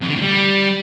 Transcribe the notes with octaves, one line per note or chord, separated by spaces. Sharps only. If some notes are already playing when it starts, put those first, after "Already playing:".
F2
D3
A2
G3